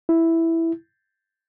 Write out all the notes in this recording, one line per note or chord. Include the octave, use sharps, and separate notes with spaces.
E4